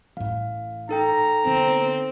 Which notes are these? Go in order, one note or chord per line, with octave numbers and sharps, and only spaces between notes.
A1 A2 F5
D#4 A4 G5 A#5
D3 B3 C4